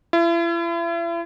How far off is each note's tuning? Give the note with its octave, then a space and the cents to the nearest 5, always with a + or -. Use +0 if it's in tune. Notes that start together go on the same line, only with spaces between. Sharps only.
E4 +40